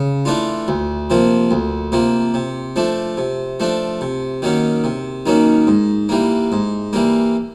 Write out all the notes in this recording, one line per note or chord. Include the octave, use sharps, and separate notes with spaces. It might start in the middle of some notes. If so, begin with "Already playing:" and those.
Already playing: C#3
E3 A3 D4 F4
D2
C3 F3 A#3
D2
C3 F3 A#3
C3
F3 A3 D4
C3
F3 A3 D4
C3
D#3 F#3 A#3 C#4
C3
D#3 F#3 A#3 C#4
G#2
E3 G3 A#3
G#2
E3 G3 A#3